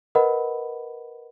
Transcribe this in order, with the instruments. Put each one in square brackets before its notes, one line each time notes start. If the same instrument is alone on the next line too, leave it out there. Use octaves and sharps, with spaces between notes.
[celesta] A#4 B4 D#5 F#5 B5